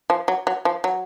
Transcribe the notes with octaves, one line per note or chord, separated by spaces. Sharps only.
F3
F#3
F#3
F3
F#3